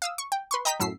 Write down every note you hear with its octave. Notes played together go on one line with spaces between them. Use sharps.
F5 D#6 E6
C#6
G5
B4 C6 C#6
D#5 G5 A#5 D#6 G6 B6
F#2 A2 E6 B6 C7